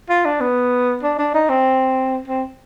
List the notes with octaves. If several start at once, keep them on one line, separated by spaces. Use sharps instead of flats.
F4
D4
B3
D4
D4
D#4
C4
C4